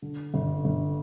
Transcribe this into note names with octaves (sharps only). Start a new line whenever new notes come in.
D3
G1
G1